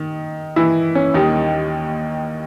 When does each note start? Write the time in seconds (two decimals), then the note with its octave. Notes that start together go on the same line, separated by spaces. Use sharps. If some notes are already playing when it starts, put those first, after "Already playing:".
Already playing: D#3
0.56 E3 E4
0.95 C#4
1.14 D#2 D#3 G3 D#4